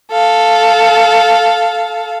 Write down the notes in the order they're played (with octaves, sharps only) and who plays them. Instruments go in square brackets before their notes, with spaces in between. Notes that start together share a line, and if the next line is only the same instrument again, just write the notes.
[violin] A4 F5